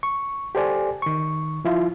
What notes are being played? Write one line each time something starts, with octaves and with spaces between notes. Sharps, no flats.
C#6
G4 A4 C5 D5 G#5
D#3 C#6
F3 E4 F4